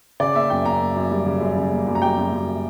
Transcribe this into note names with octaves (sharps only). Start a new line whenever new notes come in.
C#3 D5
A#3 E5
F#2 G5
A#3 A#5
F#2
F#2
G3
C#3
F#2
C#3
A#3
F#2
A#5
G3 G5
F#2
F#2